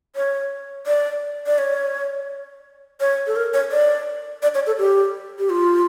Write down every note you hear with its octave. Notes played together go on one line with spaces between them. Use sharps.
C#5
D5
D5
C#5
C#5
A4
A#4
C#5
D5
D5
C#5
A4
G4
G4
F4